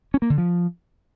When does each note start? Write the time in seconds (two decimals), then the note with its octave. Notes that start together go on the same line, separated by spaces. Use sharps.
0.14 C#4
0.22 A#3
0.30 D3
0.38 F3